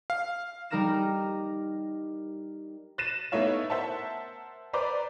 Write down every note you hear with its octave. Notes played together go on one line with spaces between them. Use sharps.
F5
G3 D#4 A#4 F6 A#6 E7
F#6 A6 A#6 C7 D#7 E7
A3 B3 D#4 E4 C#5 F5
A#4 C5 E5 F#5 A5
B4 C5 D5 A#5 D6